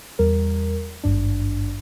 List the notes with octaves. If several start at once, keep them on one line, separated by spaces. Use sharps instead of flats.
E2 G3 A#4
G#1 G2 D4